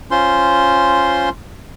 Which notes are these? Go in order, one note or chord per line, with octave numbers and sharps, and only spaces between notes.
C#4 F4 C5 C6